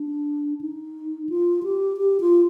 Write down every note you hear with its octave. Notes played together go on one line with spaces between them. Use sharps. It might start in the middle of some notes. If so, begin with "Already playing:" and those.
Already playing: D4
D#4
F4
G4
G4
F4